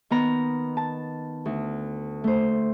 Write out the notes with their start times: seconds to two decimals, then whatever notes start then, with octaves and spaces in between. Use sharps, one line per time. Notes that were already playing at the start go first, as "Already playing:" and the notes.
0.10 D#3 B3 A#5
0.77 A5
1.45 D2
2.24 A3 C5